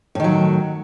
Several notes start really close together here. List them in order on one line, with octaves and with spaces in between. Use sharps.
A2 D#3 F#3